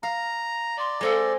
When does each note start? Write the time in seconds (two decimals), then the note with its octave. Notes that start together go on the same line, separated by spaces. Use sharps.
0.03 F5 A#5
0.77 D5 C6
1.01 G#3 C4 A4 F5